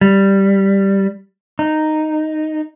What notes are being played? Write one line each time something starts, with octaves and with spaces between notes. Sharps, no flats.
G3
D#4